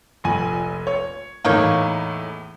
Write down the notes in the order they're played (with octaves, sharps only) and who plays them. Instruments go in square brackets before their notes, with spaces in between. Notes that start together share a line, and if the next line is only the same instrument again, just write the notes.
[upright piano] F1 A#1 G#5
C#5
[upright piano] E2 A2 [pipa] A#3 D#4 C#5